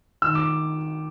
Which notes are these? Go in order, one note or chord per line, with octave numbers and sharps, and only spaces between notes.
D#3 E6
D6